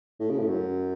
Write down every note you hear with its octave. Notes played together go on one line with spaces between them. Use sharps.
A2
C#3
A2
F#2